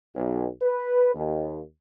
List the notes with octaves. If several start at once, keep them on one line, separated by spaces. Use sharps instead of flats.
B1
B4
D#2